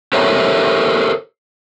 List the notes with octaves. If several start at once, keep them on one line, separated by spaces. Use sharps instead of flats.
G4 A4 A#4 C5 C#5 E5